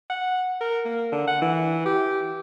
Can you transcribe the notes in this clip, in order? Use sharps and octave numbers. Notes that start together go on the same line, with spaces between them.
F#5
A#4
A#3
D3
F#5
E3
G4